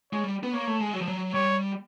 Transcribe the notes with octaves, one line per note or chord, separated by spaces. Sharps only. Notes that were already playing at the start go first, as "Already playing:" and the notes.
G#3 C#5
G3
B3
A#3 C#5
A3
G#3
F#3
F3
F#3
G3 C#5